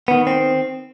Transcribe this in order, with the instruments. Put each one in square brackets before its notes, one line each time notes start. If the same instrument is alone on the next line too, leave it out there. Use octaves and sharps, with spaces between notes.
[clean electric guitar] D#3 B3
C4